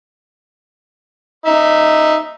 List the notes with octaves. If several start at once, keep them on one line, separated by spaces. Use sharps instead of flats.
D#4 E5